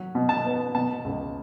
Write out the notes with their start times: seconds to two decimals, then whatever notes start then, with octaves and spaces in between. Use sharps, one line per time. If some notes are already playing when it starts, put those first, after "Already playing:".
Already playing: F#3
0.15 B2
0.29 A5
0.45 B3
0.75 B2 A5
1.05 C#2